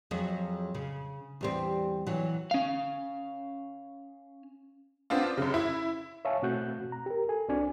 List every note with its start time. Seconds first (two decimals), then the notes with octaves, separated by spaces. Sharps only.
0.11 F2 F#3 G#4
0.75 C#3
1.41 E2 G3 C4
2.07 E3 F#3
2.51 C#4 F5
5.10 B3 C4 D4 F4
5.37 F#2 C#3
5.54 E4
6.25 C#5 E5 F5 G#5 A5 C#6
6.42 B2 A3 C4 F#4 F#6 G6
6.92 A#5
7.06 G4 A#4
7.29 A4 G#5
7.48 C2 C4 D4 F#4 D5 G#5